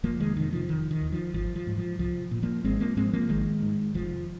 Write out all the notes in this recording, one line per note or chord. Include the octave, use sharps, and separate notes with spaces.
F1 F3 A#3
D#3 G#3
F2 C3 D#3
F3
F1 D#3
D#3
D#2
F3
G#1 F3
F3
G#2
F3
C2 F3
A#2
F3 A#3
G#1 G#3 C4
F3 A#3
G#2 G#3 C4
F3 A#3
G#1 D#3 G#3
G#2
F1 F3